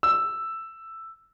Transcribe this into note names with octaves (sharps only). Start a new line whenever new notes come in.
E6